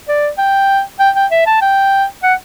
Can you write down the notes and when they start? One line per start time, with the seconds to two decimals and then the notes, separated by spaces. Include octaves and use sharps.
0.08 D5
0.38 G5
0.99 G5
1.15 G5
1.31 E5
1.46 A5
1.62 G5
2.23 F#5